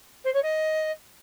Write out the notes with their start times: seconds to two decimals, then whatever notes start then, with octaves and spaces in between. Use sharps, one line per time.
0.24 C5
0.33 C#5
0.42 D#5